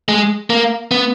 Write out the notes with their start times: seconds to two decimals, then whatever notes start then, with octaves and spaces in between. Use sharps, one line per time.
0.08 G#3
0.50 A#3
0.91 B3